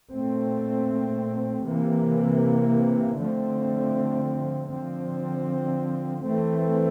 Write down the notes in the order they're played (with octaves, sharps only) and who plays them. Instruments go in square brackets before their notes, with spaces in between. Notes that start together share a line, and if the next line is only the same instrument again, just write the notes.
[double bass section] A#2 A3 C4
C3 E3 A#3
D3 F3 A3 C4
D3 F3 C4
E3 A3 C4